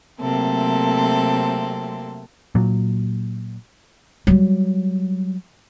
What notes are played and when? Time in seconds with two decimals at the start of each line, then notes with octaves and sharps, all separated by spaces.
0.21 C3 F#3 A3 A#3 C4 A4
2.55 A#2 F#3
4.27 F#3 G3